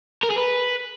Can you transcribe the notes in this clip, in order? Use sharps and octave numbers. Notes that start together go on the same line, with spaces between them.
A#4
G#4
B4